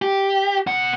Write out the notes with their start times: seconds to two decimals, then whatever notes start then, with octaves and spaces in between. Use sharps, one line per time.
0.02 G4
0.67 B2 F#5